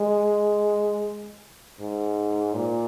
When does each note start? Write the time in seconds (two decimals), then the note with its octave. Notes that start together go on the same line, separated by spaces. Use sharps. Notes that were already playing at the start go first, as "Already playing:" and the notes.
Already playing: G#3
1.80 G#2
2.55 A#2